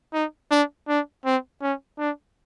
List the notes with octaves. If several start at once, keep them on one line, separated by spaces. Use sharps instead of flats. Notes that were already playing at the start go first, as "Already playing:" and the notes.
D#4
D4
D4
C4
C#4
D4